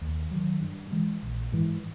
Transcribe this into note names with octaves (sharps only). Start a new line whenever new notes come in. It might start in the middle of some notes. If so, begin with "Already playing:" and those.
D#2
D#3 F#3
G2
E3 G#3
A#1
G#2 E3